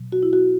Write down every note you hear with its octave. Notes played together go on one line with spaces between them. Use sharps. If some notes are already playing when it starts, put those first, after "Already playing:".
Already playing: B2 F#3
F#4
E4
F#4